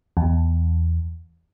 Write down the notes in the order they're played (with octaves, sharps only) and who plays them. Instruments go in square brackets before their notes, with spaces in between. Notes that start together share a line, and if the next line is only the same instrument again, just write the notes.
[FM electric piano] E2